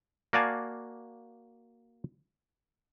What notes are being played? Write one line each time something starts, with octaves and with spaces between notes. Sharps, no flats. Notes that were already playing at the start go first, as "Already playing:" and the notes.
A#3 F#4 D5 F5 G#5 A5